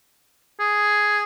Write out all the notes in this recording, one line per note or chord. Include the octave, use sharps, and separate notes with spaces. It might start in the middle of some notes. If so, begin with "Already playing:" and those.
G#4